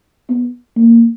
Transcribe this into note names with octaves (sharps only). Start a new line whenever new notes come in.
B3
A#3